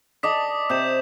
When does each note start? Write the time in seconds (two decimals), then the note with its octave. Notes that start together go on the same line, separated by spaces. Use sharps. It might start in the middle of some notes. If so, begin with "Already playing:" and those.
0.23 D5 D#5 A5 D6 D#6 B6
0.70 C3 D#6 G6 E7